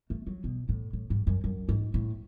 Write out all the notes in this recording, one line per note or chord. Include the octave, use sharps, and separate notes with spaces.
A3
F#3
B2
A2
A2
G#2
F#2
F#2
G#2
A2